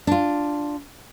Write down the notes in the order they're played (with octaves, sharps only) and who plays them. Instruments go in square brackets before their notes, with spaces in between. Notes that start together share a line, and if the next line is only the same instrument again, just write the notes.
[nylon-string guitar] D4 F4